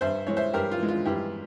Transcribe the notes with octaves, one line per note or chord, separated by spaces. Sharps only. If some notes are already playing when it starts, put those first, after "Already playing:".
G2 C5 E5
E3 G#3 C#5
C5 E5
G2 G4 A#4
F4
E3 G#3
F4
G2 E4 G4